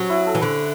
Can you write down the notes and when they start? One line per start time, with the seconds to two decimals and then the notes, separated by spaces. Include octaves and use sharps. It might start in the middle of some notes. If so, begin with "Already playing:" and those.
Already playing: F#3 C#4
0.10 E4
0.26 A4
0.35 E3
0.41 D3 B4